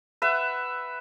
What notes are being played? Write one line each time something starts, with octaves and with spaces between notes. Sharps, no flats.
B4 E5 F#5